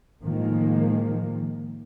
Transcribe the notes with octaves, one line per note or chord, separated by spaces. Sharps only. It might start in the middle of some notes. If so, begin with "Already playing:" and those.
A2 D#3 F3 G#3 A#3